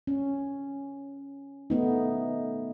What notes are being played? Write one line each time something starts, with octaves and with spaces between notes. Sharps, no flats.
C#4
A3 B3 D#4